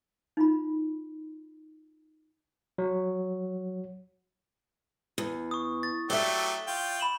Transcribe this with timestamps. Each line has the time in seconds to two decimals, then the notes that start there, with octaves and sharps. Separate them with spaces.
0.37 D#4 F4 B5
2.78 F#3
5.18 E2
5.51 C#6 D#6
5.83 A6
6.10 F#3 A3 G4 D5 E5 G7
6.67 F4 G5
7.00 B5 E7 F#7